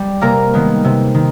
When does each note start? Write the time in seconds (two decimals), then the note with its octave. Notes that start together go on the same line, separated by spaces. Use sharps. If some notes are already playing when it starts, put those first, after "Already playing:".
Already playing: G3
0.21 C3 A#3 A#4
0.54 D#3 G#3 B3
0.84 C3
1.15 D#3